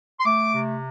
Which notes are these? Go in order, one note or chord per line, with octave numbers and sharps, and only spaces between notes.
C6
A3 D6
C3